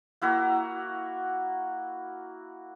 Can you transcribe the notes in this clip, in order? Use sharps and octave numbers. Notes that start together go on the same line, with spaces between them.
A#3 E4 F#4 A#4